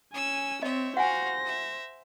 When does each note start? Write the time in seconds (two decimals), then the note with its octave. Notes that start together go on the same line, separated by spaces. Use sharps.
0.13 C#4 G#5 E6
0.63 C4 C#5 D#5 E5
0.97 F#4 C5 F5 F#5 G#5 A#6
1.45 E5